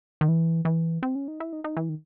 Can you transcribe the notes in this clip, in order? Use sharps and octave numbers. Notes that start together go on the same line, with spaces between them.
D#3
E3
E3
C4
C#4
D#4
E4
D#4
D#4
E3
D#3